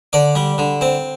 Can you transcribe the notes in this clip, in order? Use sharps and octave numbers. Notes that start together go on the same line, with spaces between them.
D3 D5
G3
D3
C4